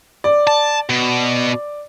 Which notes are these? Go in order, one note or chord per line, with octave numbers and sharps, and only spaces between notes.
D5
A5
B2